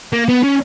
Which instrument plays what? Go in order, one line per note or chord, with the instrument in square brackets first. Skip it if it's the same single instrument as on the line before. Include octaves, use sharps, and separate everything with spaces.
[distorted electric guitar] A#3
B3
C#4